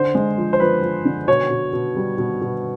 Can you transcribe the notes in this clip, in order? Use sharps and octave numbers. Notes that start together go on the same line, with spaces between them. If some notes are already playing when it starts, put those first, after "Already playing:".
Already playing: D3 C5
G#3
F3
C5
F3 B4
F3
D3
B2 C#5
B2
B2
G3
B2
B2